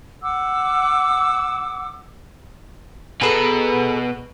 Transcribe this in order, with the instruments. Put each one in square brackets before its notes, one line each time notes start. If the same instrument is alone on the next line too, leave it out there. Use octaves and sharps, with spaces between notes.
[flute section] F#5 D6 E6
[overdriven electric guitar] B2 B4 [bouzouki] G#4 A4 A#5